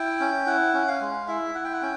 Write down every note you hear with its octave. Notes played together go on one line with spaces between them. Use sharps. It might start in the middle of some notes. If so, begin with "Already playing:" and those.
Already playing: E4 G5
C#4
E4 F#5
C#4
F5
G#3
E4 E5
E4 F#5
G5
F#5
C#4 G5